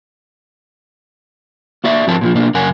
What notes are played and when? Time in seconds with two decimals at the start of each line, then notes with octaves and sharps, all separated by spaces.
1.84 A#3 F#4 D5 E5
2.07 G#2 F3 C4 A#4 A5
2.21 A#2 D#3 F3
2.34 B2 A#3 D4
2.54 F#2 C#3 A#4 F#5 G#5